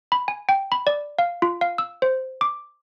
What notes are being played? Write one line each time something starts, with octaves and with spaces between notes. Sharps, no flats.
B5
G#5
G5
B5
D5
F5
F4
F5
E6
C5
D6